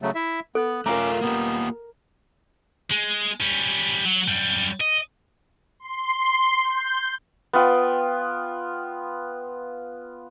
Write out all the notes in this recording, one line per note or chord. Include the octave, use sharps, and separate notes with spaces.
C#3 F#3 A3
E4 E5
B3 A4 F#6
A3 C#4 F4 A#4 A#5 D6
A#3 B3 F4 G4
G#3
G3 C#4
F#3
F#2 G3
D#5
C6
G6
B3 F4 G5